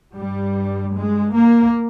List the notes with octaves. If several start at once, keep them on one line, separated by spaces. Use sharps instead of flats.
G2 G3
G#3
A#3